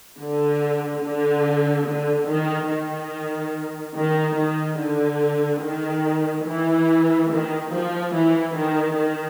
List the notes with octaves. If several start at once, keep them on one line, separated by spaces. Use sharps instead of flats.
D3
D3
D3
D#3
D#3
D#3
D#3
D3
D#3
E3
D#3
F3
E3
D#3
D#3